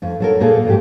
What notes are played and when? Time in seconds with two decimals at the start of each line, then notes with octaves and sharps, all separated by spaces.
0.02 F2 A3
0.20 F#3 A4 A#4
0.40 A#2 A#3 G#4 A4
0.65 F2 G#2 G4